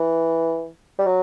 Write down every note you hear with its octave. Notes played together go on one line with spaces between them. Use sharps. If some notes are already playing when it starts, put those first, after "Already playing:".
Already playing: E3
G3
F#3